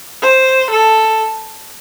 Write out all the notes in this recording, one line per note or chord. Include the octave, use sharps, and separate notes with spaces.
C5
A4